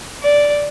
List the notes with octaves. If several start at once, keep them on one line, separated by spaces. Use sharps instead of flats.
D5